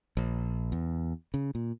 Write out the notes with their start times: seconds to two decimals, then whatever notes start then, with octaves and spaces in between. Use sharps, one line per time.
0.17 A#1
0.72 E2
1.34 C#3
1.55 A#2